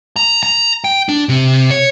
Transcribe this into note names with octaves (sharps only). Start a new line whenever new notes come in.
A#5
A#5
G5
D4
C3
C#5